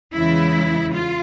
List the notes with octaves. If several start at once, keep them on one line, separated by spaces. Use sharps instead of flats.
E2 C#3 E3 G#3 E4
F4